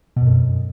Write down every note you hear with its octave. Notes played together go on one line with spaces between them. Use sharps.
B2
F2
F#2